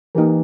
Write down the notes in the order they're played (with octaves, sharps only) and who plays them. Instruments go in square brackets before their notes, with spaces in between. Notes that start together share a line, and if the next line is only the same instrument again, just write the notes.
[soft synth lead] E3 [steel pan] A#3 D#4 G4 A#4